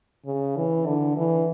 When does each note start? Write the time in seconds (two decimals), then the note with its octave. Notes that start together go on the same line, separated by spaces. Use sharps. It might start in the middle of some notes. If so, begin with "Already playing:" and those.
0.25 C#3
0.56 E3
0.86 D3
1.17 E3